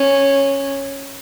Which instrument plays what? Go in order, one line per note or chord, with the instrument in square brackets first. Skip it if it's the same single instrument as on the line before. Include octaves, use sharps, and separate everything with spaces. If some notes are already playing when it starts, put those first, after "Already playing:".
Already playing: [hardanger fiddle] C#4